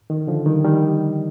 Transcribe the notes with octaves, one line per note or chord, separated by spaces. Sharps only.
D#3
D3 F3
D#3 G3
D#3 G3